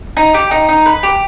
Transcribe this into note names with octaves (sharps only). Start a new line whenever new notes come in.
D#4
G4
D#4
D#4
B4
G4